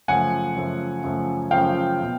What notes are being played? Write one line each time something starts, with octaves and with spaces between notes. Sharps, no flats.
F#2 C#3 F3 A3 F#5 G#5
F#2 C#3 F3 A3
F#2 C#3 F3 A3
F#2 C#3 F3 A3 F5 G5
B2